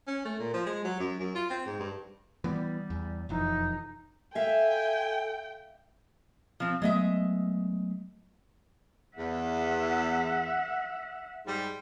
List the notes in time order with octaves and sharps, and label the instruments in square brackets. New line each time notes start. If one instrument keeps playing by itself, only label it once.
[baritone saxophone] C#4
A3
A#2
F3
G#3
F#3
F#2
F#2
F4
C4
G#2
G2
[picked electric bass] E3 B3 [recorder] G3
[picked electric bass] E2
[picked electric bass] E1 F2 E3 [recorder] D#4
[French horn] A4 [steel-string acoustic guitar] E5 F5 [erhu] G5 [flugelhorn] G#5
[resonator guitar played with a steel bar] F3 C4
[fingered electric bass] F#3 A3 B3 [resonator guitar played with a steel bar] G#3 D#5 E5
[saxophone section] E2 [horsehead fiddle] E5 F#5
[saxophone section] G#2 G3